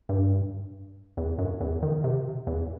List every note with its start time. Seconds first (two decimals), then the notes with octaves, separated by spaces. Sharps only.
0.09 G2
1.17 E2
1.38 F#2
1.61 E2
1.83 D#3
2.04 C3
2.47 E2